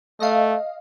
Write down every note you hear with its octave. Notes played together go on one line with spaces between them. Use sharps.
A3 D#5 F5